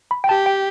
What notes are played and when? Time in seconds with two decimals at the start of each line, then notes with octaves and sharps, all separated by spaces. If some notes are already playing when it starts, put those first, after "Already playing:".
0.11 B5
0.24 G5
0.28 G4 A5
0.46 G5